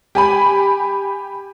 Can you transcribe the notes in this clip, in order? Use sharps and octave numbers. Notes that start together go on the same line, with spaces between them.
G4 G#5 B5